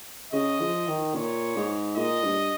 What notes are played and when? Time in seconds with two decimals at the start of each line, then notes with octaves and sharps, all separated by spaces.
0.32 C#3 D#5
0.60 F3
0.87 D#3
1.14 A#2 C#5
1.56 G#2
1.96 A#2 D#5
2.24 G2